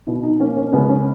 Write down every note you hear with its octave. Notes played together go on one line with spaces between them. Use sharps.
B2 E4
D#4
A#3 C#4
C#4
C#2 B3
C#4